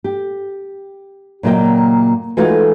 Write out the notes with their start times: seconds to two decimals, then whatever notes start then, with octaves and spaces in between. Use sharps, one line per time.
0.04 G4
1.43 A#2 C#3 F#3 A#3 D#5 G5
2.37 E3 G#3 A3 D#4 F4 F#4